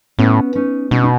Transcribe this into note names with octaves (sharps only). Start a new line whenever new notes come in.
A2 B3 C#4
C#4 D#4
B2 C#4 D#4
D#4